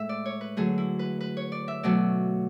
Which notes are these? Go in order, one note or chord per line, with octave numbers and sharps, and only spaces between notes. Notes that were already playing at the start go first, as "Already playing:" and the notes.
Already playing: A2 G#3 E5
D5
C#5
B4
D3 F#3 A3 G#4
E4
B4
B4
C#5
D5
E5
B2 F#3 A3 D5